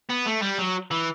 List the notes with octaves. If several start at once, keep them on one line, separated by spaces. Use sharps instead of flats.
B3
A3
G3
F#3
E3